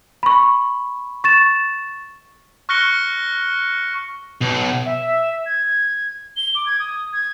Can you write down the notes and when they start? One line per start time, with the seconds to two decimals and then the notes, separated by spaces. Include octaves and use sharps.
0.23 B5 C#6
1.24 C#6 A6 E7
2.69 C#6 F6 F#6 A#6 C#7 G7
4.42 B1
4.85 E5
5.46 G#6
6.37 G7
6.55 D6
6.66 G#6
6.79 D#6
7.13 G#6